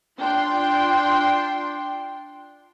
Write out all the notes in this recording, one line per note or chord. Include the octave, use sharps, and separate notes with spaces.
D4 F4 G5 C6